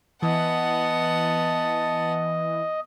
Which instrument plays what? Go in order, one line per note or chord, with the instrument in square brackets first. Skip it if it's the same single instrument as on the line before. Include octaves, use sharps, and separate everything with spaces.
[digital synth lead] E3 [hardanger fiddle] B3 F#5 [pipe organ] D#5 [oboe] A5